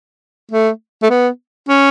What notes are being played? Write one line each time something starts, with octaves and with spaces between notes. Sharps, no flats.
A3
A3
B3
C#4